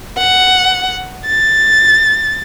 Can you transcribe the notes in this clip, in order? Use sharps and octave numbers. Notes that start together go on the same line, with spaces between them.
F#5
A6